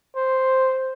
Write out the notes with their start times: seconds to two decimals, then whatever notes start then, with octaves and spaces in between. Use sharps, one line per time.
0.16 C5